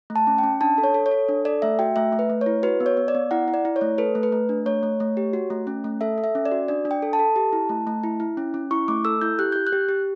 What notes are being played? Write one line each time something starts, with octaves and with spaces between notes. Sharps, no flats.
A3
A5
C#4
G5
C#4
D4 A5
A4
C#5
A4
C#5
A4
D4
A4 D5
A3 E5
F#4 G5
A3 E5
A3
B4
A3
E4 C#5
F#4 B4
B3
C#5
B3
D5
B3
E4 F#5
E4
D5
E4
C#5
A3
A4 B4
A3
B4
A3
D4
A3 C#5
A3
A3
G4
F#4
A3
C#4
A3
A4 E5
A4
E5
C#4
D5
F#4
D4 D5
D4
G5
A4
A5
A4
G4
E4
A3
A3
E4
E4
C#4
C#4
E4 C#6
A3 D6
A4 E6
E4 G6
G4 F#6
G4 G6
F#6
G4
G4